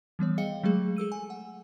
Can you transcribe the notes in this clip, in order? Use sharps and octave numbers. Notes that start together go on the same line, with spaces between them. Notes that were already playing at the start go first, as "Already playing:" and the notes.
E3 G3 B3 C#5
G#4 D#5 F5 G5 C#7 G7
F#3 G#3 A3 G#4
G#4 A4 E6 D#7
G#5
F#5